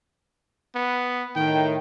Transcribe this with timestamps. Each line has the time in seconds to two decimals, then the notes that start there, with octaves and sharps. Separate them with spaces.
0.75 B3
1.36 A2 D#3 G5